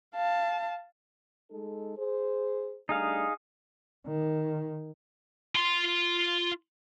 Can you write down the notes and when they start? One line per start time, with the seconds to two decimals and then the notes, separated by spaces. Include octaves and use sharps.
0.16 F5 A5
1.51 G#3 D#4 A4
1.97 G#4 C5
2.89 G3 A3 D4 D#4 G#4 F5
4.07 D#3
5.55 F4 C6